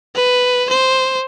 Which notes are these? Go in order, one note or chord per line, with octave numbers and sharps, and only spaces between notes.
B4
C5